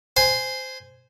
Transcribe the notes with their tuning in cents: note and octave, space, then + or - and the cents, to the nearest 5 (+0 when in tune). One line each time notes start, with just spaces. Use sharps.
C5 -10 G#5 +0